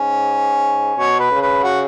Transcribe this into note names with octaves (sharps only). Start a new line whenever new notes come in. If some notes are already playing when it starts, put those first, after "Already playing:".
Already playing: G#2 C#4
B2 C#5
B4
C#3
B4
F#4